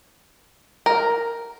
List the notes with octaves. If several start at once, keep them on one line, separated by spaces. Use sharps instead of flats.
A#4